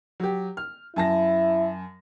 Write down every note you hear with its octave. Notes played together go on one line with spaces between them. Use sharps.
F#3 G4
F6
F#2 E4 A5 A#6